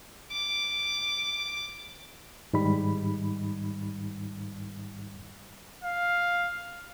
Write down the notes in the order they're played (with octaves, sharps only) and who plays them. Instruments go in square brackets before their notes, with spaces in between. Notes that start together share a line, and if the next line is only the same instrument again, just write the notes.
[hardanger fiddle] D6
[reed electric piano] G#2 D#3 G3 D#4 B5
[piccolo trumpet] F5